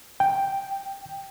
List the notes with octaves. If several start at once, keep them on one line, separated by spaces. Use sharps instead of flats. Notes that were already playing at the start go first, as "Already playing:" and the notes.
G5